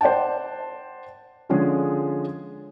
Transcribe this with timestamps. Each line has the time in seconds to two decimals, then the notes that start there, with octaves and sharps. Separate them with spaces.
0.01 C5 D5 F#5 G5 A5
1.49 D3 F3 G#3 C#4 G#4